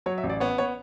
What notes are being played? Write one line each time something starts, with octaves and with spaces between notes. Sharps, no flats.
F#3 C#5
E5
A1
D5
B3 C#5
B3 C#5